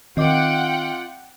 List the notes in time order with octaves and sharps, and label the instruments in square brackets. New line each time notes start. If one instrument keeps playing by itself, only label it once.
[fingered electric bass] D#3 [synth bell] C4 D#5 D6 [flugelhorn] F4 [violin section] F#5 G5